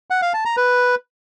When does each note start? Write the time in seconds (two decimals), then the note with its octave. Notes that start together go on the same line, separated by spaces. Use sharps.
0.10 F#5
0.22 F5
0.34 A5
0.45 A#5
0.57 B4